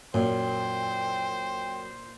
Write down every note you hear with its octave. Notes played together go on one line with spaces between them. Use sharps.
F#2 A#2 C5 G5